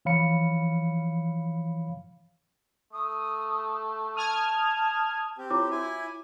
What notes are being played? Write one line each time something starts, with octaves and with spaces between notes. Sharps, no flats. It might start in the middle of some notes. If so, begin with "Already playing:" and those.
E3 F3 C#5 F5 B5 C#7
A3 D#6
A5 D#6 F6 G#6
C4 G4
E4 F4 C#5 D6
E4 F#4 G#5